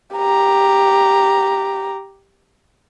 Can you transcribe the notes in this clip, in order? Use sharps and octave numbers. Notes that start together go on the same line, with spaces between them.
G4 A#5